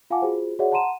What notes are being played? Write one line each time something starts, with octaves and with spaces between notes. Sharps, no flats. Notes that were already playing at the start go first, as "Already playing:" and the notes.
F4 F5 F#5 G#5 A5 D6
F4 F#4 G#4 C5
F#4 G#4 C#5 D5 E5 F#5
F#5 A5 A#5 C6 D#7 E7